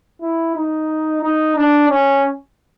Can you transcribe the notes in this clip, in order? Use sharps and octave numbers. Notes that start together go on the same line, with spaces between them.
E4
D#4
D#4
D4
C#4